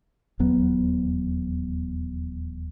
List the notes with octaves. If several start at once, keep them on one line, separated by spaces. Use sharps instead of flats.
D#1 E2 F#3 B3